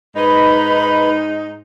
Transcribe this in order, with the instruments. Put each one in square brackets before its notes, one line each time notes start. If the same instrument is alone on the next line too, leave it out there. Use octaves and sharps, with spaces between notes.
[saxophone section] G#2 D#4 [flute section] B4 B5